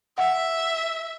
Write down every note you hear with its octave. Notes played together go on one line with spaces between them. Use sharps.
E5 F#5